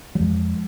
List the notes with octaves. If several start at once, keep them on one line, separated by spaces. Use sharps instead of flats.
F#3
F2 F3 G#3